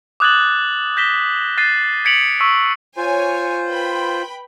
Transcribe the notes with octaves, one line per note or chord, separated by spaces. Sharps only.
D6 D#6 F#6 G#6 A6 F#7
G6 A#6 B6 E7 G7
F#6 G6 A6 C7 D#7
G#6 B6 C#7 D7 F7 F#7
C#6 E6 B6
F4 C5 C#5 G#5
B4 G5 B5